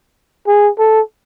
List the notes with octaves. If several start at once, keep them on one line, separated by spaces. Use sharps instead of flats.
G#4
A4